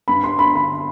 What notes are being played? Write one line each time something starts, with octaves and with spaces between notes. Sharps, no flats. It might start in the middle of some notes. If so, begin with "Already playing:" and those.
G2 B5
C6
D3 B5
B5